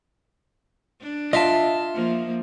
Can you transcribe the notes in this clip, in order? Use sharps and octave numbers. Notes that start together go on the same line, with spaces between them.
D4
F4 D#5 E5 A5
F3 A#3